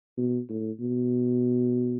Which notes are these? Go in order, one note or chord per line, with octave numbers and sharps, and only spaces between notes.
B2
A2
B2